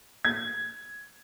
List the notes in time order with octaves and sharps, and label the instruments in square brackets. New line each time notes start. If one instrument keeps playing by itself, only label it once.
[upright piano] G#6